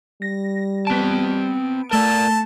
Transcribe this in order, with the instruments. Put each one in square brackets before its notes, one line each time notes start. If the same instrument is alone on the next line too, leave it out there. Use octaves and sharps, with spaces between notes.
[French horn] G3 [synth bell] A#6
[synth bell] B3 D7 [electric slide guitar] C4 A5
[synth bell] A3 E7 G7 [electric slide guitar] A#4 D5 [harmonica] A5